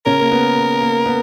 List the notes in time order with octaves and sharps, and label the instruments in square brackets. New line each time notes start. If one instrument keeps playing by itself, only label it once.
[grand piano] C#3 C#4 [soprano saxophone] A#4
[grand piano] A#3
B3
A#3
A#3
B3